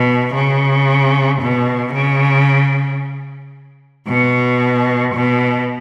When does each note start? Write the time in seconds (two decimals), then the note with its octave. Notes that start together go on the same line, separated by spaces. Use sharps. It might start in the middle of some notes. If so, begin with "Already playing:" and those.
Already playing: B2
0.35 C#3
1.41 B2
1.95 C#3
4.08 B2
5.14 B2